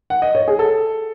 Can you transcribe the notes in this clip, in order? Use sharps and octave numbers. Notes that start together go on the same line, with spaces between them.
F#5
D#5
C#5
G#4
A4